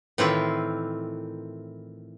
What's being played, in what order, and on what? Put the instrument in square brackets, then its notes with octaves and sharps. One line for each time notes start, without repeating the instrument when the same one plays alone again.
[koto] A2 D#3 E3 C4 E4 F4